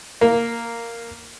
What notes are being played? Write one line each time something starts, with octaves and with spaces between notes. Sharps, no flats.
A#3